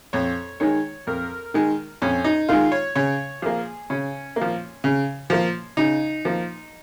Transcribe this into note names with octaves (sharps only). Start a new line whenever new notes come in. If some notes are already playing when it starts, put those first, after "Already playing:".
F2 C#5
D#3 G#3 C#5
F2 A#4
D#3 G#3
F2 C#4
D#4
D#3 G#3 F4
C#5
C#3 C#5
F3 A#3 G#4
C#3 C#4
A#3
F3
C#3
F3 A#3
C#3 D#4
F3 A#3